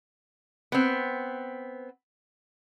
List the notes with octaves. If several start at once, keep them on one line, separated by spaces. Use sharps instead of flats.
B3 C4